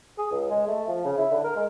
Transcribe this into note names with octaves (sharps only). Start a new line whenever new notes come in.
G#4
C#2
G#3
A3
F3
C#3
E4
D3
A#4
G#3